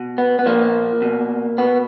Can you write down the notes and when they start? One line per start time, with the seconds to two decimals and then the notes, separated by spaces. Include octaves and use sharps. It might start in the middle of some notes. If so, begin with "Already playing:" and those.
Already playing: B2
0.18 B3
0.39 B3
0.46 A#2 F3 A#3
1.02 B2
1.58 B2 B3